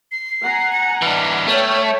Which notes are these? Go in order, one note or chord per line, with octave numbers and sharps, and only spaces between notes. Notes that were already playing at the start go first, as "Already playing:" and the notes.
C7
F#5 G#5 A#5
C#7
E3 D4 F6
A3 C#5 G5 A5